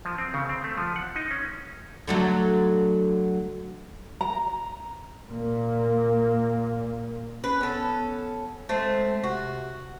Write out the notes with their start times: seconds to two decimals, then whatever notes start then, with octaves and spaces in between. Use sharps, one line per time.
0.05 F3
0.18 C4
0.34 C#3
0.49 C4
0.64 A3
0.77 F3
0.96 F#5
1.16 D#4
1.31 C#4
2.07 D3 F#3 A3
4.21 A#5
5.29 A#2 A#3
7.44 C#4 B4
7.61 B3 C#4 A4
8.69 G#3 A3 C4
9.23 C3 F#4